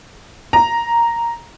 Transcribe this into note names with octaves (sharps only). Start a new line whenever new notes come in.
A#5